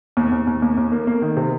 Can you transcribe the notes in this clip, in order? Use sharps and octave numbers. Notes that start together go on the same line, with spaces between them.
D#2
D#2
D#2
D#2
D#2
A#3
A#3
D#3
C3